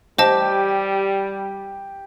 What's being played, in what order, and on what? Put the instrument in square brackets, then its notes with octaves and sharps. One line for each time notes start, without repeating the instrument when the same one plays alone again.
[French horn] G3 [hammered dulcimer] G4 [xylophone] C5 D#5 A5